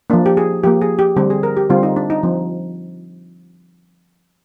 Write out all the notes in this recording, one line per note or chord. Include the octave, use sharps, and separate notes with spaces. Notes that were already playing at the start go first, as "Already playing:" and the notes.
F3 A#3 D4
G4
G#4
F3 A#3 G4
G#4
G4
D3 G3 C4 G4
G#4
A#4
G4
D3 G3 C4 F4
D#4
D4
D#4
F3 C4